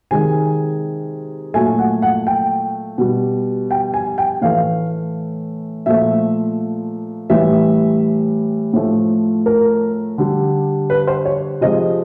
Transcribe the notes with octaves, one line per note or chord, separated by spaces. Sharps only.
C3 D#3 G#3 G#5
A#2 F#3 A3 G#5
F#5
F#5
G5
B2 G3
G5
G#5
G5
A2 E3 A3 F5
A#2 F3 A3 E5
A2 E3 G3 E5
A2 F3 A3
A#4
D3 G3
B4
C5
C#5
C3 F3 G#3 D#5